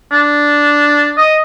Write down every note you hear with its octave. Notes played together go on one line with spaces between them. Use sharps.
D4
D#5